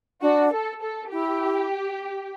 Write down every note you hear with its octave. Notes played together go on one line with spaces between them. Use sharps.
D4 F#4
A4
A4
E4 G4